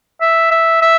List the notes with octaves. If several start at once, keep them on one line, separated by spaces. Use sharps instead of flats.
E5
E5
E5